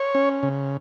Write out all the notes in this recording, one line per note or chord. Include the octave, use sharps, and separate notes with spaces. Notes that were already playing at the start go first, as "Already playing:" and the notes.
Already playing: C#5
C#4
C#3